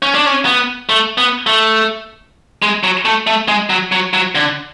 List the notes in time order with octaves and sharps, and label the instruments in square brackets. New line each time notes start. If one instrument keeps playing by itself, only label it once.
[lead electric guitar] C#4
D4
C#4
B3
A3
B3
A3
G#3
F#3
A3
A3
G#3
F#3
F#3
F#3
D3